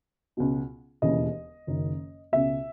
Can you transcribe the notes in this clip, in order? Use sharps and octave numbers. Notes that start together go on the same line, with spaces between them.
C#2 B2
E1 D#2 C#3 E3 D#5
F#1 F#2 D#3
C#2 B2 E5